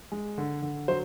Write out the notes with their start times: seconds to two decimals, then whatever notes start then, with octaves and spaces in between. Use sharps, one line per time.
0.12 G#3
0.38 D3
0.62 D3
0.88 F#3 C5